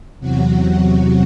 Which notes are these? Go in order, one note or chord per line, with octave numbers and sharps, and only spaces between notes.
E2 C3 F#3 F#4